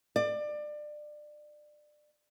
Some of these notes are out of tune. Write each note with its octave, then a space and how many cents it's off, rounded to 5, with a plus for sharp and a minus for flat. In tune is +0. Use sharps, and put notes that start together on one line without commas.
D5 +25